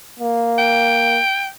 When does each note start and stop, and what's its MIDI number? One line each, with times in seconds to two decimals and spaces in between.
0.20 1.19 58
0.58 1.49 79